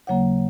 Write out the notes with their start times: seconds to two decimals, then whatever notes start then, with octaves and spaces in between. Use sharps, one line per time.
0.07 D#2 C#3 F#3 A#3 C#5 F#5